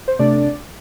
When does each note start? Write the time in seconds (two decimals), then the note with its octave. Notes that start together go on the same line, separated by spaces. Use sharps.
0.08 C5
0.19 C3 A3 D4 D5